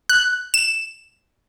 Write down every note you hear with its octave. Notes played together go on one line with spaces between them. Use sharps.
F#6
E7